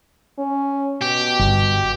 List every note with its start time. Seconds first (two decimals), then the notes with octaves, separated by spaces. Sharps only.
0.38 C#4
1.02 B2 G4
1.39 G1